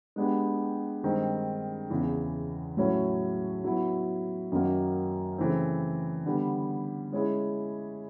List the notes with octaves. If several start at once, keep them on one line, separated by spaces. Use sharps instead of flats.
G#3 B3 D4 G4
G2 D#3 G#3 C4
E2 C#3 E3
A2 F#3 A3 C#4 E4
F#3 B3 E4
F#2 D#3 F#3 A#3
C#3 E3 A3 C4
D3 G3 B3
G#3 C#4 E4 G#4